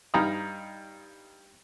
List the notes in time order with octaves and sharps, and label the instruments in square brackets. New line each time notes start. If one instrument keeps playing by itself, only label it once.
[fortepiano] G2 D#4 F5 A#5 B5 D#6